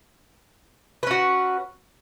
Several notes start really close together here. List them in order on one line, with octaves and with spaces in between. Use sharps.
B4 C#4 F#4